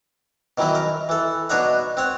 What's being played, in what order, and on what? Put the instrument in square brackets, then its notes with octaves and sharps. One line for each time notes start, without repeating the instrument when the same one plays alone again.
[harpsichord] B2 D#3 E3 F#3 E4
A#4
E3 A4
B2 D4 D#4 C#5 D#5 F#5
C4 C#5 F#5